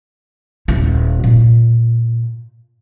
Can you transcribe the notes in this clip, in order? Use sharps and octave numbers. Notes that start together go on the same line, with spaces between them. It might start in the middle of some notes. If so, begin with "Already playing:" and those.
D#1 E4
A#2